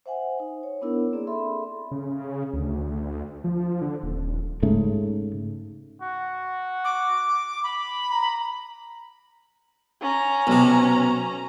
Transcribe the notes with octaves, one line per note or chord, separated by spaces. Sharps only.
C5 E5 F#5 G#5
D#4 C5
C#5
B3 D4 E4 A#4
A#3 C4 G#4 D5
A4 E5 B5 C6
C#3
D2
F3
D3
D#1
G#2 C#3 A3
F#4
D6
B5
A#5
C#4 A#5
B1 C3